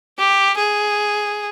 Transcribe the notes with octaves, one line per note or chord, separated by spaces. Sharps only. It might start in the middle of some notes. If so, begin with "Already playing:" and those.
G4
G#4